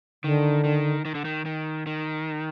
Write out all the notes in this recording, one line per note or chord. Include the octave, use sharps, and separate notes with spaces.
D3 D#3
D#3
D#3
D3
D#3
D#3
D#3